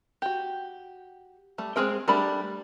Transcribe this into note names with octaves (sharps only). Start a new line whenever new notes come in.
F#4 G4
G3 A3
G#3 C4 G#4 A#4 G5
G3 A3 D4 A#4 B5